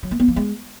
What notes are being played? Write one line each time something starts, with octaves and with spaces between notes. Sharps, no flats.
F#3
A#3
B3
F3
G#3